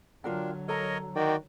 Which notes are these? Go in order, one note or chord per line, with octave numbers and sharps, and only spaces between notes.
D3 F#3 D4 F4 A#4 G5
A4 A#4 C#5 D#5 A#5
D#3 F#4 D5 G5